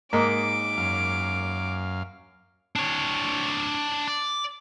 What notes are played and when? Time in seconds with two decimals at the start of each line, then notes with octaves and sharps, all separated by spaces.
0.13 G#2 A#3 D#4 D6
0.78 F#2 F5
2.76 D4 C#5
4.08 D5